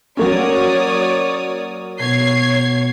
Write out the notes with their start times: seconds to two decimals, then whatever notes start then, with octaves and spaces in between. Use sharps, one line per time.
0.17 F#3 A#3 C#4 C#5 D5 D#6
1.99 B2 C#5 G#6 C7